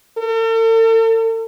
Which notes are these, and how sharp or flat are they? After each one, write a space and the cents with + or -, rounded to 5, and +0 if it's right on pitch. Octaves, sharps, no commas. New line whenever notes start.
A4 +45